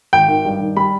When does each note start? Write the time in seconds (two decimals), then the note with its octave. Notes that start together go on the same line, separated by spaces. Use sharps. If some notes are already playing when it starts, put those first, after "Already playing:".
0.13 G#1 G5
0.28 D#3
0.45 G2
0.61 D#3
0.77 G3 B5